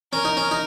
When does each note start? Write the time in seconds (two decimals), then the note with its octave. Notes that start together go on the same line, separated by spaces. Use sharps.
0.13 C#4 A#4
0.25 D#4
0.37 C#4
0.51 D#4